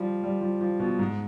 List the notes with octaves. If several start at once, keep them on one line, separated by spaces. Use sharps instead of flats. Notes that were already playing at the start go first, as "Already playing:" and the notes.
Already playing: F3 G3
G3
F3
F3
B2
G#2